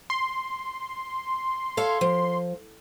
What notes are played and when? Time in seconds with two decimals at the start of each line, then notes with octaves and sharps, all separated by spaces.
0.10 C6
1.77 A4 C#5 F5
2.01 F3